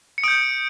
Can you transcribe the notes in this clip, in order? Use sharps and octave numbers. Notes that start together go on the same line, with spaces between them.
C#7
D#6 G6 D7